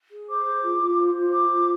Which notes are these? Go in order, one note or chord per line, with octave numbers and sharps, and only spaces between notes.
G#4
C5 D6
G#4
F4
F4
C5
F4
C5 D6
F4